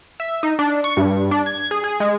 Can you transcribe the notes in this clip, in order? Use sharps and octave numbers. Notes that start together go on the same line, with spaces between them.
E5
D#4
D4
C#6
G2
D4
G#6
G#4
G#4
G#3